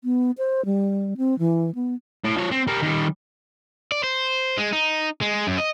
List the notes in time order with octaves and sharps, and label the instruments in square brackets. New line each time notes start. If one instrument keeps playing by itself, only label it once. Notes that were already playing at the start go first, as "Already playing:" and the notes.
[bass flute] B3
C5
G3
C4
E3
B3
[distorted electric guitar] A2
F3 C#5
C4
G3 A#4
D#3 G3
[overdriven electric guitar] D5
C5
G#3
D#4
G#3
F#2
D#5